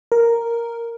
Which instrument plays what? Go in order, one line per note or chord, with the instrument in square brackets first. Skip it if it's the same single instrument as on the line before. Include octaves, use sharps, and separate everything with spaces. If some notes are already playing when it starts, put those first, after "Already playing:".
[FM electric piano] A#4